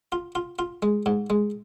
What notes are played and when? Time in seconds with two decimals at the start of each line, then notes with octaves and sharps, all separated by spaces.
0.12 F4
0.35 F4
0.59 F4
0.82 G#3
1.06 G#2
1.30 G#3